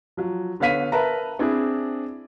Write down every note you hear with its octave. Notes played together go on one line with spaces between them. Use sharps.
F3 F#3
D3 B3 C#5 F5 B6 D#7
A#4 B4 E5 A5 A#5
C4 D4 E4 G#4